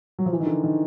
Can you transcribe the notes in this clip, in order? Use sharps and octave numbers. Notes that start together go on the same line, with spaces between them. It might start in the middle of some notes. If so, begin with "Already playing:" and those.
F#3
F3
E3
D#3
D3
D#3